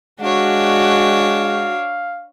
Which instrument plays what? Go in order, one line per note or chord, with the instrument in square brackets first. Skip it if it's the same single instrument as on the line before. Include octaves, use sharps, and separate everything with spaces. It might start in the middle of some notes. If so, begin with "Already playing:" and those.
[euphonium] G#3 [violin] D4 C#5 [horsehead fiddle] F#4 [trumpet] F5